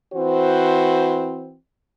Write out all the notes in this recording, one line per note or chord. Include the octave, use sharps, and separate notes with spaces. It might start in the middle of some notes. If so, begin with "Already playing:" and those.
E3 C4 F#4 C5